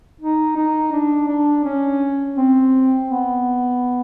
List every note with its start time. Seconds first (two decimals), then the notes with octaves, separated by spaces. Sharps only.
0.21 D#4
0.57 D#4
0.93 D4
1.28 D4
1.65 C#4
2.37 C4
3.08 B3